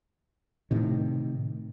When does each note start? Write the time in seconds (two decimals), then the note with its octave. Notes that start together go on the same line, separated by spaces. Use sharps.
0.71 A2 C3 D#3